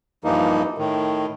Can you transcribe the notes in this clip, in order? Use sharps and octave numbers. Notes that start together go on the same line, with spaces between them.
G2 E3 F3 A#3 D#4
A2 D#3